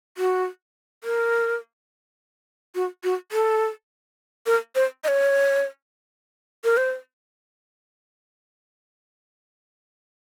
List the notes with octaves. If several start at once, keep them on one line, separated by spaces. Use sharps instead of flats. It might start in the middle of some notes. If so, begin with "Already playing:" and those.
F#4
A#4
F#4
F#4
A4
A#4
C5
D#5
C#5
A#4
C5